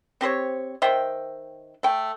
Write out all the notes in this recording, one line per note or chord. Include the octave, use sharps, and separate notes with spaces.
C4 G4 C5 C#5
D#3 C5 E5 G5
A3 G5